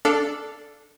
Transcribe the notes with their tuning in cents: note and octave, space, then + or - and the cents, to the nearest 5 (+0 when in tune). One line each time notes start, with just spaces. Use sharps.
D4 +0 A4 +0 F5 -5